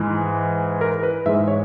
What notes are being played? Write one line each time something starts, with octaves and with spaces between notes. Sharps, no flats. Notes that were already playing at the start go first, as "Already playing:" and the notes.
Already playing: G#2 E3 G#3
A#4
B4
G#2 E3 G#3 E5
C#5